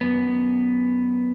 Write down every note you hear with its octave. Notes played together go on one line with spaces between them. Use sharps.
F#2 B3